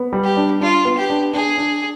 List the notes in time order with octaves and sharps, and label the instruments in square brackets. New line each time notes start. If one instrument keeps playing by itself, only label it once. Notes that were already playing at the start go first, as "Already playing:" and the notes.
Already playing: [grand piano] B3
G3
[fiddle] G4
[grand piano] D4
[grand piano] D4 [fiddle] F4
[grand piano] B3
[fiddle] G4
[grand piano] D4
[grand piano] D4 [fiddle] G#4
[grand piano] D4